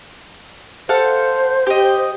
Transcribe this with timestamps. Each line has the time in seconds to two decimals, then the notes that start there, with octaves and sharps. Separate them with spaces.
0.89 A4 C5 F5 F#5
1.67 G4 D#5